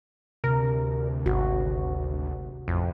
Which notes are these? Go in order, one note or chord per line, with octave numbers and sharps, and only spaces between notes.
D2 C3 A#4
G#1 F#4
A1 F2